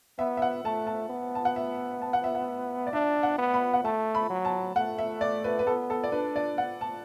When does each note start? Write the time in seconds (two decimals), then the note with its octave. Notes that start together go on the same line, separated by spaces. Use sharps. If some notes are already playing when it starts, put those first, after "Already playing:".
0.19 B3 E5
0.37 E5
0.42 F#5
0.64 A3 A5
0.87 A5
1.10 B3
1.35 A5
1.45 F#5
1.56 E5
2.02 A5
2.13 F#5
2.24 E5
2.35 F#5
2.87 D5
2.93 D4 E5
3.23 F#5
3.39 B3
3.54 B5
3.74 F#5
3.84 A3 A5
4.15 B5
4.30 F#3
4.45 A5
4.76 A3 F#5
4.99 E5
5.21 D5
5.44 B4
5.59 B4
5.67 B3 A4
5.90 A4
6.04 D5
6.12 D4 B4
6.36 D5
6.58 F#5
6.81 A5